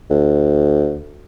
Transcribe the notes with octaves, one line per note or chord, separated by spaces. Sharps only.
D2